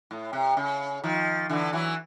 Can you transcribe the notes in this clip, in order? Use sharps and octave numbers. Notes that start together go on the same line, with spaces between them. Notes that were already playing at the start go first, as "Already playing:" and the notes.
A2
C3
C#3
D#3 F3
D3 E3
E3 F#3